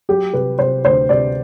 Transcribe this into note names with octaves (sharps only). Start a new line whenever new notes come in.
F#3 G4
C3 B4
C3 C5
D2 C5
C3 D5